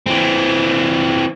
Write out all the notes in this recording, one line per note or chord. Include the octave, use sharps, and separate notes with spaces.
E3 C4